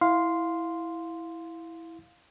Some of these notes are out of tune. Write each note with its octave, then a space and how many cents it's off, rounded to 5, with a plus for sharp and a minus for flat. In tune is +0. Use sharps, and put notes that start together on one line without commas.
E4 +0 F5 +15 C6 -5